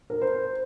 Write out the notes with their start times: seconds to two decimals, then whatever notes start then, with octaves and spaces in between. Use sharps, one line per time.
0.10 A#4
0.21 C5